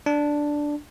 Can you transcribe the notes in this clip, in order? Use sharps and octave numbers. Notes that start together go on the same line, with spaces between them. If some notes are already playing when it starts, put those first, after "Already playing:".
D4